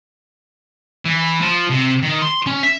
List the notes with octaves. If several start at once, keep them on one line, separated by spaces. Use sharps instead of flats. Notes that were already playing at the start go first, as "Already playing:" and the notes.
E3
F3
C3
D#3
C6
C#4
E5